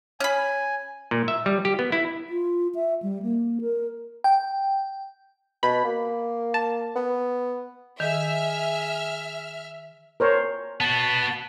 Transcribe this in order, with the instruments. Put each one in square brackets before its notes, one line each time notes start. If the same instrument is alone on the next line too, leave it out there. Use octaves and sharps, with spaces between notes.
[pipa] C#4 B5 [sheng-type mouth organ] G#5
[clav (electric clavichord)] A#2
E5
G3
G4
B3
E4
[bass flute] F4
E5
G3
A#3
A#4
[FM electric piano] G5
[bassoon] B2 [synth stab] B5
[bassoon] A#3
[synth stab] A5
[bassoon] B3
[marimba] D#3 [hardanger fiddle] G#4 [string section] E5 F6
[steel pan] A#4 C5 C#5
[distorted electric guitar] B3 F#4 [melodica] A5